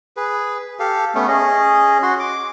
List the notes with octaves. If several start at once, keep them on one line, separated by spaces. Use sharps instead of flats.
G#4 B4
G4 A4 F5
A3 B3 C#4
C#4 G#4 D#5
F#4 C6
D6